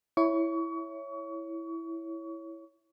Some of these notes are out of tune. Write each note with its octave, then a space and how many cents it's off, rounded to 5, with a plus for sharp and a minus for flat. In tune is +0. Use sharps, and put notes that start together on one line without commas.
E4 +0 C#5 +0 C#6 +30